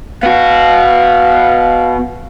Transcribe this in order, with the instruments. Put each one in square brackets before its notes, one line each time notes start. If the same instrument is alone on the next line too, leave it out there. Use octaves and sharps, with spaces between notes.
[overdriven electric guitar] B3 F#4 [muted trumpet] F5